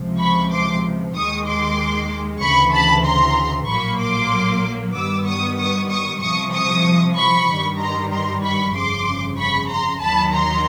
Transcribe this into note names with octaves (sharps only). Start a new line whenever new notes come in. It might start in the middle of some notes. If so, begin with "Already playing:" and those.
Already playing: C#2 C3 F3
B5 C#6
C6 D6
D#2 D#3 G#3 C#6 D#6
C6 D6
D2 C#3 E3 B5 C#6
A5 B5
A#5 C6
A#1 A2 F#3 A#3 B5 C#6
C6 D6
G2 D#3 G3 B3 D6 E6
C#6 D#6
C#6 D#6
C#6 D#6
C2 C3 F3 C#6 D#6
C#6 D#6
B5 C#6
G2 D#3 G3
A#5 C6
A#5 C6
B5 C#6
G1 F2 C#3 C6 D6
B5 C#6
A#5 C6
D#2 D#3 F#3 A5 B5
A#5 C6